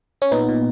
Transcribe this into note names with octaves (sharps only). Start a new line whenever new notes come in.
C#4
A#2 B3 D#4
A#2